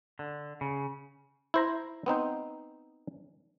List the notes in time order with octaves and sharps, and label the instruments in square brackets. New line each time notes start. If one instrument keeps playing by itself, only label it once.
[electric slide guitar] D3
C#3
[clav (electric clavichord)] E4 C5 A#5
B3 C4 D#4 C5